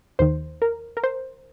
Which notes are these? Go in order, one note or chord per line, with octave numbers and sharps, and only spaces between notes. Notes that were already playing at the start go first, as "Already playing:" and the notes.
D#2 D#3 C5
A#4
A#4
C5